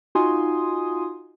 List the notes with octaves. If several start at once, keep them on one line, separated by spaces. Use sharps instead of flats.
D#4 F4 F#4 G#5 C6 D#6